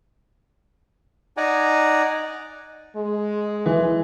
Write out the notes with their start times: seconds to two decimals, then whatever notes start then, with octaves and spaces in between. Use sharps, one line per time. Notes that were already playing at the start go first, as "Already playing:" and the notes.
1.37 D#4 D5 F#5 G#5 A#5
2.96 G#3
3.66 E3